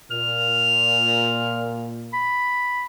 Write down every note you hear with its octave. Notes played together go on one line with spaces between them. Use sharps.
A#2 F6
B5